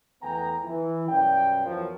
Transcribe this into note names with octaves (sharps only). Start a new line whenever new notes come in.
E2 A3 B3 G5 G#5 A#5
E3
F#2 B2 G3 D5 F5 G5
E2 F3 F#3 A#4